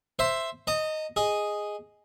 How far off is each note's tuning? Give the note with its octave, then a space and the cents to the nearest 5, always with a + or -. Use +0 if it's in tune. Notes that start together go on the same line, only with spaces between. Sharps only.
C5 +0 E5 +5 C6 +0
D#5 +0 A#5 -40
G#4 +0 D#5 +0